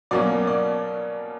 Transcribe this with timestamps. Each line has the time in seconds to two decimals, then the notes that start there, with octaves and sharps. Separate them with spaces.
0.11 B2 F#3 A#3 C#4 D5
0.47 D5